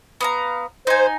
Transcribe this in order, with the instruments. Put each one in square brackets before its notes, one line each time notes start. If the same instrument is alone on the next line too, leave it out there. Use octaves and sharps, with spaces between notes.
[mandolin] B3 F5 A#5
[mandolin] D#4 G#5 [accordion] C5